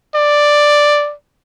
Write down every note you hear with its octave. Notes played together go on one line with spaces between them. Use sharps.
D5